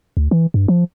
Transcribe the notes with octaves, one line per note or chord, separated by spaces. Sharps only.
D2
E3
G2
F3